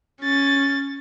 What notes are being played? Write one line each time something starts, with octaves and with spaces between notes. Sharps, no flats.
C#4 A6